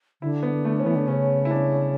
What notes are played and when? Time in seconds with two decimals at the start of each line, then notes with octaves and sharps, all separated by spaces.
0.22 D3 E4
0.43 B3
0.65 A3
0.80 C#4
0.84 E3 B3
0.96 D3
1.07 C#3 C#4
1.45 E4
1.51 D4